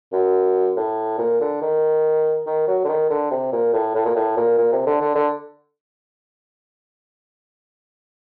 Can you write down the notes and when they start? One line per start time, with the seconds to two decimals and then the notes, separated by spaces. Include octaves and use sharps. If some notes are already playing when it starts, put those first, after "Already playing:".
0.13 F#2
0.77 A2
1.18 A#2
1.41 D3
1.61 D#3
2.46 D#3
2.68 F#3
2.84 D3
2.88 D#3
3.10 D3
3.31 C3
3.52 A#2
3.73 A2
3.95 A2
4.05 A#2
4.16 A2
4.37 A#2
4.58 A#2
4.73 C3
4.86 D3
5.00 D3
5.15 D3